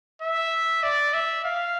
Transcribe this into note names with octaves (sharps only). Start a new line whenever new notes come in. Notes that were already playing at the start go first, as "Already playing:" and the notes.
E5
D5
E5
F5